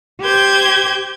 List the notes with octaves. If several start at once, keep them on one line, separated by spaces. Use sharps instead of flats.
G4 C5 G6 G#6